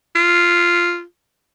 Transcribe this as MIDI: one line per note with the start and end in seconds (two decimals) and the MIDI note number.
0.16 1.03 65